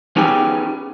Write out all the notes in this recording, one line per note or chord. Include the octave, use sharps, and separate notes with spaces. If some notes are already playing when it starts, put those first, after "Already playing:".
B3 C#4 D#4 G4 G#4 G#5